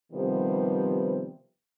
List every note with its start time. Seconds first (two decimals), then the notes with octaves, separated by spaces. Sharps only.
0.13 C3 D#3 F3 G3 B3